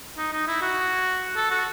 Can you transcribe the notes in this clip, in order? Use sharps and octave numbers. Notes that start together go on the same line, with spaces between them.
D#4
D#4
E4
F#4
A4
F#4